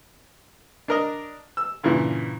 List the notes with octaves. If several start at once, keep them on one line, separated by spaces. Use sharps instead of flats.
D4 A#4 D#5
E6
G2 A#2 C#3 E3